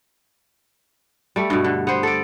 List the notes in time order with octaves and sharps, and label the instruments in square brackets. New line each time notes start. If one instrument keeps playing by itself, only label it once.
[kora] G3 A3
G2 B2
D3
B3 C5
A4 D5